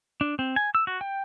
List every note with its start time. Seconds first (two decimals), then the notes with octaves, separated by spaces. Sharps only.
0.21 D4
0.39 C4
0.56 G#5
0.75 E6
0.87 F#4
1.01 G5